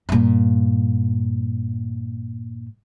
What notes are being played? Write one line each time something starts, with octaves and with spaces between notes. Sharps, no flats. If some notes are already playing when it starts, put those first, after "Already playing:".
G2 A#2